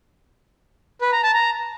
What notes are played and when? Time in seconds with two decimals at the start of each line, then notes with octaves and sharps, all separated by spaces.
1.01 B4
1.12 A#5
1.23 A5
1.34 A#5